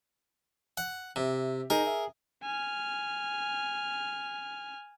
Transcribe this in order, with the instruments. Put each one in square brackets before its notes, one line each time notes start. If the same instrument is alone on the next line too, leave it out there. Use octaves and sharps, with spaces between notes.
[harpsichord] F#5
[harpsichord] C3 [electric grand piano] G4 E5
[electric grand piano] D#4 D#5 [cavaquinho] G#4 [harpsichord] A#4
[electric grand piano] E5
[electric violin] G#5 F6